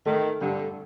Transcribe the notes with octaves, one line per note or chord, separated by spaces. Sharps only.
D#3 A3
G2 D3